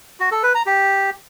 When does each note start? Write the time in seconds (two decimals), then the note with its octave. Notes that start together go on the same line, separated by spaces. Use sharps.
0.20 F#4
0.31 A4
0.43 B4
0.55 A#5
0.66 G4